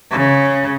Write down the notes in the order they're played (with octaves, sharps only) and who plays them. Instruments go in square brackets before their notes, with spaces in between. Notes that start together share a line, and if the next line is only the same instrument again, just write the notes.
[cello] C#3